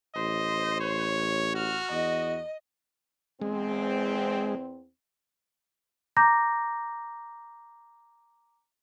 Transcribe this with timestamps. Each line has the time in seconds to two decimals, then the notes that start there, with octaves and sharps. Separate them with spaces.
0.16 A1 C5 D#5
0.81 C#5
1.55 F#4 F6
1.91 E2 D#5
3.41 E2 G#3 C4
6.17 A#5 D6 G6 A#6